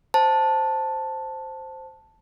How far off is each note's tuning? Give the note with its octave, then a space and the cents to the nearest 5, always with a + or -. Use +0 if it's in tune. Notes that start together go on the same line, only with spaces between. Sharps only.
C5 +0 A5 +0